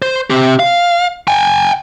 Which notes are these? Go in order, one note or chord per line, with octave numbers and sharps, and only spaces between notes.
C5
C4 G4
F5
G5 G#5